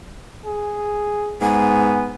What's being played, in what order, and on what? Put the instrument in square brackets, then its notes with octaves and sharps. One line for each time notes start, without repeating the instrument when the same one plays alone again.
[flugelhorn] G#4
[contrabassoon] G#2 [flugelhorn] B3 [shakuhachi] G#5